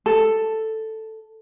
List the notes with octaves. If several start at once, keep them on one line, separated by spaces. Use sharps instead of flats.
A4